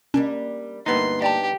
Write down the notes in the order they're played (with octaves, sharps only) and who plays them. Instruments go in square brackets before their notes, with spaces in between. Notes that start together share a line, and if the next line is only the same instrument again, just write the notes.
[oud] G3 A#3 D4 [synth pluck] C#4
[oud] D2 A#3 E4 [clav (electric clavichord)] G2 B3 D#4 [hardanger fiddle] C6
[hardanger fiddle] G4 [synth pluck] D5 G5 A5